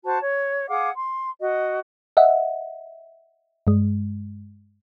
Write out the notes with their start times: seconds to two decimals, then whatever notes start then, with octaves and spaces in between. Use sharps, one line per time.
0.04 F#4 C5 A5
0.21 C#5
0.69 G#4 F5 F#5 D6
0.95 C6
1.40 F#4 D#5
2.17 D#5 E5 F#5
3.67 G2 G#3